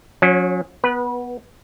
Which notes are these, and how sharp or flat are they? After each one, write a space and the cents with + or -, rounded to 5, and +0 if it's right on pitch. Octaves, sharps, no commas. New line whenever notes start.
F#3 -40 C#4 +0
B3 +0 B4 -25